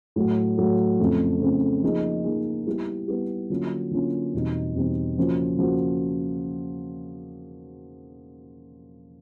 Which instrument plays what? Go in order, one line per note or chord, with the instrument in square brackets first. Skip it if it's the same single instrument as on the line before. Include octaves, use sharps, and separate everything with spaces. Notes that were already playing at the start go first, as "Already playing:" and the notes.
[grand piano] A2 F#3 A3
A2 F#3 A3
F2 C#3 F3 A3 C4
F2 C#3 F3 A3 C4
F3 A#3 D#4 G#4
F3 A#3 D#4 G#4
G3 B3 E4 G4
G3 B3 E4 G4
D3 F#3 A#3 C#4 F4
D3 F#3 A#3 C#4 F4
E2 B2 G3 C4 D#4
E2 B2 G3 C4 D#4
C#3 F3 A#3 C#4 F#4
C#3 F3 A#3 C#4 F#4